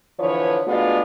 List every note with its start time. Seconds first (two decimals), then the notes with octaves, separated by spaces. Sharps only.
0.20 D3 E3 F3 B4 C#5
0.67 G#3 A3 B3 D4 F4 F#4